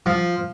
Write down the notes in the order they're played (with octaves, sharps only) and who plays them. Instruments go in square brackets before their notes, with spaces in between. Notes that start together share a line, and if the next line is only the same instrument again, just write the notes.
[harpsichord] F3